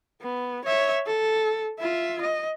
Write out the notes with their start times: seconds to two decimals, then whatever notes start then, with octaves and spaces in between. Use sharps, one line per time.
0.22 B3
0.65 C#5 E5
1.07 A4
1.80 F4 E5
2.22 D#5